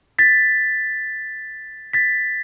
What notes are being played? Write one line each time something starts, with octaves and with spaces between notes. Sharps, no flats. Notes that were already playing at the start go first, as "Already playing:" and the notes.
A6 B6
A6 B6